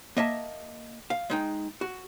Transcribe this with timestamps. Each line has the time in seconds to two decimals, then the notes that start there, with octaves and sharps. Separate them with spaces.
0.17 A#3 D#5 E5 A5
1.10 F5
1.30 G#3 D#4 G5
1.81 F#4